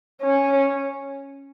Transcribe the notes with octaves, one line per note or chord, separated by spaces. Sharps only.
C#4